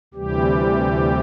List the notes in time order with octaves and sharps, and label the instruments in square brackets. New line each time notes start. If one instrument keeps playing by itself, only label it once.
[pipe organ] D2 C3 E3 G3 G4